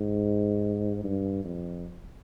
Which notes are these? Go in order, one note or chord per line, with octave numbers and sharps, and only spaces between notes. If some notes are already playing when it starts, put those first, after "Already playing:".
Already playing: G#2
G2
F2